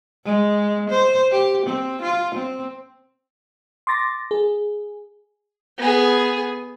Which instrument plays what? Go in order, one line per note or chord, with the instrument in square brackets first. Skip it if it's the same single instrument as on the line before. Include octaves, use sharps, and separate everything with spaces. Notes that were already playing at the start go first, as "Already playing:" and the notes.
[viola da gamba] G#3
C5
G4
C4
F4
C4
[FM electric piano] C6 D6 A6 A#6
G#4
[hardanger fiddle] B3 G#4